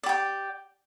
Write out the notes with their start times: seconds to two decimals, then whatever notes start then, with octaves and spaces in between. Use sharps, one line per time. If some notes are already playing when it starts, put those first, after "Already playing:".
0.03 D5
0.06 G4
0.09 G5